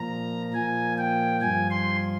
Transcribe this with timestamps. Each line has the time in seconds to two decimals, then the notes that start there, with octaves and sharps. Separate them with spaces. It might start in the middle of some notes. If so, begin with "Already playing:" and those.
Already playing: A#2 F3 A#5
0.54 A#2 F3 G#5
0.98 G5
1.41 G2 F3 G#5
1.71 C6